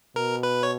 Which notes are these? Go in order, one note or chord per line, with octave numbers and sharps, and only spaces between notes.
B2 A#4
B4
C#5